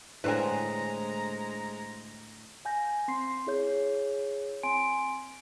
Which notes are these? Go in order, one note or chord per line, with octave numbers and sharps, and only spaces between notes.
A2 D3 G#3 B4 C5 G#5 A#5
F5 G#5 G6 A#6
C4 C6 C7
E4 G#4 C#5 G6
C4 G#5 C6 D7